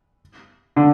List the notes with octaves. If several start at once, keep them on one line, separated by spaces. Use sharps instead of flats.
D3